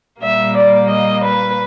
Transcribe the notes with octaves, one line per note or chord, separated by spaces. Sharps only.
A#2 G3 A#3 E5
D5
D#5
B4